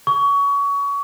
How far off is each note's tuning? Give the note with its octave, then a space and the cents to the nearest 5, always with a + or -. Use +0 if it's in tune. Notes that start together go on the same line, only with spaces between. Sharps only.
C#6 +25